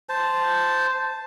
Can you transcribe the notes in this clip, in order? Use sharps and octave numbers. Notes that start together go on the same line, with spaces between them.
C5 A5